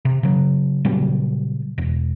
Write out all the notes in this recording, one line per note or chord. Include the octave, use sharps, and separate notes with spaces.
C3
C#3 F#3
A#2 C#3 F#3 G3
E1